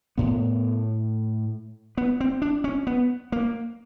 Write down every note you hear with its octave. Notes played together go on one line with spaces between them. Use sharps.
A2 B3
B3
C4
D4
C#4
B3
A#3